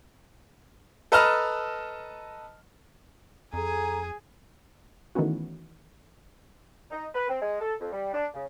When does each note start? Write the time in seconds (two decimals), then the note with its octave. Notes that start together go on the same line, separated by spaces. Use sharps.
1.12 A4 B4 D#5 A5 A#5 F6
3.53 F2 G#4 A4 G#5 A#5
5.15 D#3 E3 A3 B3 C#4 F#4
6.91 D#4
7.14 B4
7.28 C4
7.41 G#3
7.61 A4
7.80 F2
7.93 G3
8.13 D4
8.34 C#3